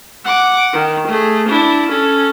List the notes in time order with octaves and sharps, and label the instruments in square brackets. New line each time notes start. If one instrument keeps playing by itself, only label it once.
[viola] F#5 D6
D#3
A3 G#4
D4 E4
C#4 A4